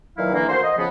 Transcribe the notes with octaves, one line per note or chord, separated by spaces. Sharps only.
A#2 D#3 E3 F#3 E4 F5
D3 E3 A#3
D2 A#3 F#4 C5
D#5
C#3 F3 B3